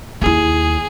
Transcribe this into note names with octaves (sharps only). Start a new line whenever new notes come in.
D#2 E4 G#4